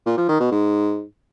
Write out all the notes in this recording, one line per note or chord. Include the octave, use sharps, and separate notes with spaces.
A#2
F3
D#3
B2
G#2